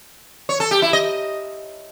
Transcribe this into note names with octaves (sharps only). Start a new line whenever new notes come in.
C#5
A4
G4
E4
D#5